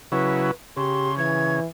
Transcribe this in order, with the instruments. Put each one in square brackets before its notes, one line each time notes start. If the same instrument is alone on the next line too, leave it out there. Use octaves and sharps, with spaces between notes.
[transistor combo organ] C#3 F#3 E4 [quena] B4
[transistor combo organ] C#3 [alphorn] G4 [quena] C6
[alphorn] E3 [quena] G#6